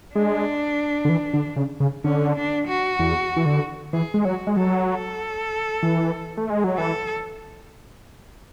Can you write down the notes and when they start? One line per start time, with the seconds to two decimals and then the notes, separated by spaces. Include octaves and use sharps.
0.15 G#3 D4
1.05 D3
1.09 E3
1.34 D3
1.56 C#3
1.80 C#3
2.04 D3 C#4
2.36 D4
2.68 F#4
2.99 E2
3.36 E3
3.46 D3
3.93 E3 G#4
4.14 G#3
4.25 F#3 F#4
4.47 G#3
4.56 F#3 A4
4.88 A4
5.83 E3
6.37 A3
6.50 G#3
6.64 F#3
6.77 E3 A4